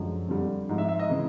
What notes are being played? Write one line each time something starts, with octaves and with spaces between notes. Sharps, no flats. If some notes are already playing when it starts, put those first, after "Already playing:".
Already playing: F#2 D3 F3 G#3
F2 D3 G3
G#2 F3 G#3
E5
E5
D#5
C#3 E3 G#3